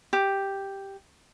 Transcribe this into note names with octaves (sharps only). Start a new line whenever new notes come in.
G4